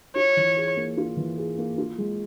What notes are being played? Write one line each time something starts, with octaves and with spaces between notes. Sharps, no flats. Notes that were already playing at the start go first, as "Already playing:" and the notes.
F4 C#5
E3
G#4
A#3
F4
E3
G#4
A#3
F4
G#3